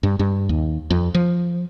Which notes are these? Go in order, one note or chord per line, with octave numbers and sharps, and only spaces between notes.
G2
G2
D#2
F2
F3